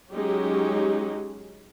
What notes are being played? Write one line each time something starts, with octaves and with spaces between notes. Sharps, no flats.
F#3 G#3 C#4 D#4 G4